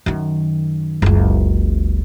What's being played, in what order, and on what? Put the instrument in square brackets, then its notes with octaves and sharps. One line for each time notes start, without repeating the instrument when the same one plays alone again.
[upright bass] F#2 D#3
F#1 C#2